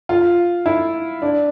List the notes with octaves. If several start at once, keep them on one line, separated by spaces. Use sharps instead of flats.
F4
E4
D4